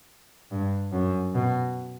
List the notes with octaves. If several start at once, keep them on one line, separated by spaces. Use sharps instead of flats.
G2
F#2
B2